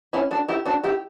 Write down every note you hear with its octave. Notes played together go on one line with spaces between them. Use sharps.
C#4 E4
D4 F#4
E4 G4
D4 F#4
E4 G4